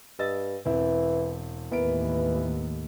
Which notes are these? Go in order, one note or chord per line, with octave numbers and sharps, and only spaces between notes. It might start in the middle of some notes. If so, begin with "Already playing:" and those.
G2 D#5 E6 A6
E1 E3 C4 E4
D#2 A2 E3 B3 A#4 D7